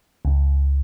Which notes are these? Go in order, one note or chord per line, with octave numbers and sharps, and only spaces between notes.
C#2